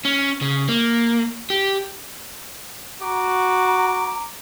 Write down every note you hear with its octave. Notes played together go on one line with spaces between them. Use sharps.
C#4
C#3
A#3
G4
F#4 A#5 D6